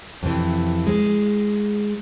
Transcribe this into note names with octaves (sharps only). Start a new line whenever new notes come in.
F2 C3 E3
G#3